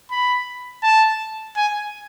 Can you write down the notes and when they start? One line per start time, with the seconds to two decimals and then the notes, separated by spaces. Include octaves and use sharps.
0.11 B5
0.83 A5
1.56 G#5